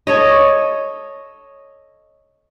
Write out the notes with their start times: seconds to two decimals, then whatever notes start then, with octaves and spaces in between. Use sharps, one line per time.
0.07 A4 C#5 D#5